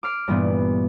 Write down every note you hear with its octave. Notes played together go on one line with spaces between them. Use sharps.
D6 F6 C7
G2 A#2 E3 B3